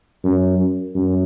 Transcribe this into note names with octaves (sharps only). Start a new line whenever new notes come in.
F#2
F#2